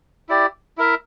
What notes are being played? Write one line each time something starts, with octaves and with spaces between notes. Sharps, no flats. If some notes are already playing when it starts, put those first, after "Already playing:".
E4 G4 D5
E4 A#4 E5